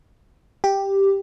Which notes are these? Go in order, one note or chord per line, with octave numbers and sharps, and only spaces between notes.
G4